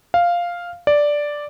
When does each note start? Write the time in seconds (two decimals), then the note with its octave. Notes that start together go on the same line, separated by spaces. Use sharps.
0.14 F5
0.87 D5